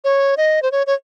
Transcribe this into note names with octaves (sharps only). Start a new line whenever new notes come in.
C#5
D#5
C5
C#5
C#5